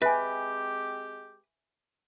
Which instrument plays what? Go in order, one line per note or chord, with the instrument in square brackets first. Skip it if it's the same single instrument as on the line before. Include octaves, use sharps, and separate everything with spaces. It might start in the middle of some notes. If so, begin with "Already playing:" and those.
[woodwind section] G#3 C4 G4 [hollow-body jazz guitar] B4 [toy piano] E5 G#5